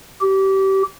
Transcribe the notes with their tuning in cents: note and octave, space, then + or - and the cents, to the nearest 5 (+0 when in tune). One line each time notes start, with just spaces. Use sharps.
G4 -25